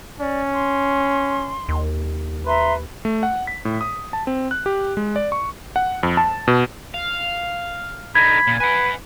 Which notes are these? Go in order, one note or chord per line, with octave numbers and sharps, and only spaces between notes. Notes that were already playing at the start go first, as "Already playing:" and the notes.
C#4 D5
C6
D#2
B4 E5 A#5 C6
A3
F#5
B6
A2
D#6
A5
C4
F#6
G4
G#3
D5
C#6
F#5
F2
A5
B2
F5
D3 D#4 B5 G#6
A#2
B4 F#5 G#5